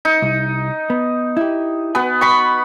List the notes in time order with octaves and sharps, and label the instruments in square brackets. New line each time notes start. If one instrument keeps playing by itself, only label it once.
[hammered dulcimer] D#4
[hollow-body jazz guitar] C2
B3
E4 G4
[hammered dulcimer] B3 [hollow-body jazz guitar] F#4 G#5
[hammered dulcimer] B5 C#6